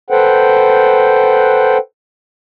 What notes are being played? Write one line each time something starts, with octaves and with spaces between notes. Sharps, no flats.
A4 B4 C5 F#5 G5